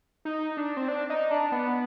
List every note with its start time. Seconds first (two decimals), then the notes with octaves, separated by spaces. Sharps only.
0.25 D#4
0.57 D4
0.77 C4
0.88 D4
1.10 D#4
1.31 D4
1.52 B3